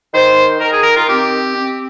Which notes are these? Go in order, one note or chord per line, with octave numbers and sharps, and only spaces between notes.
D#3 C5
D#3 A#4
G#4
A#4
F4
C4 G4
C4